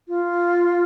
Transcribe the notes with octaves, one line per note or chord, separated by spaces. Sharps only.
F4